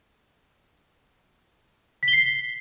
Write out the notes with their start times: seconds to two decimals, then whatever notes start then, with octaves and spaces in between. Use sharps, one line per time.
2.03 B6
2.08 G7
2.13 C7